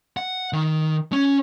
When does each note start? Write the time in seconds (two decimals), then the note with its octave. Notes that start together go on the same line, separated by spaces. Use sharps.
0.17 F#5
0.53 D#3
1.13 C#4